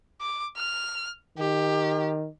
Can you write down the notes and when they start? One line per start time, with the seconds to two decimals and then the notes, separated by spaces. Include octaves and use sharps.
0.21 D6
0.57 F6
1.38 D#3 G4